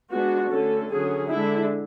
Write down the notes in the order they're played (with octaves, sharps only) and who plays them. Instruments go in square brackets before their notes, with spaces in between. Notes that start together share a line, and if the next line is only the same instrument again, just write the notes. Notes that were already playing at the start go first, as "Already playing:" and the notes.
[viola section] G#3 B3 D4 F#4
D3 A3 C#4 A4
D3 F#3 C#4 G#4
D3 G#3 D4 E4